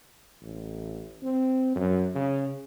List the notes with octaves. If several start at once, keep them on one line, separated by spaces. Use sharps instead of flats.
A1
C4
F#2
C#3